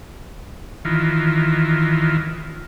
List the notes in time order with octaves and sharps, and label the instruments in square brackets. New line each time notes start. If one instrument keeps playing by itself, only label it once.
[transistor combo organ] D#3 E3 F4